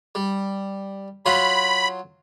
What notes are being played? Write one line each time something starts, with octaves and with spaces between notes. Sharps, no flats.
G3
F#3 F4 B5 C6